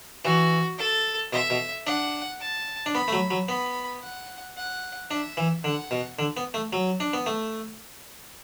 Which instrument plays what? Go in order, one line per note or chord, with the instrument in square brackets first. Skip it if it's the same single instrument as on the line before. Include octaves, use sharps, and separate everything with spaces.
[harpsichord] E3 [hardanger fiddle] F#4
[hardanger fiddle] A4
[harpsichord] B2 [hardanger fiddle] E5
[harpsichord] B2
[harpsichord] D4 [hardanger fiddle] F#5
[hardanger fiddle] A5
[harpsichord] D4
[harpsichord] B3 [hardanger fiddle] B5
[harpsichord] A3
F#3
F#3
[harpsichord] B3 [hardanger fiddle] B5
[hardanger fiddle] F#5
F#5
[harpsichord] D4 [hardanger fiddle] E5
[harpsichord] E3
[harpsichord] D3 [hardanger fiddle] F#5
[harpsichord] B2
D3
B3
A3
F#3
D4
B3
A3